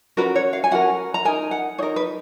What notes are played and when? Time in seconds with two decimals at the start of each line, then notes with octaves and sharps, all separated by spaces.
0.17 C#4 F#4 A#4 B4
0.36 C#5
0.53 F5
0.64 G#5
0.71 C#4 F#4 A#4 F#5
1.14 A#5
1.25 D#4 A#4 G#5
1.51 F#5
1.78 D#4 A#4 C#5
1.96 B4